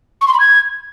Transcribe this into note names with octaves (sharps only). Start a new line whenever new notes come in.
C#6
C6
B5
G#6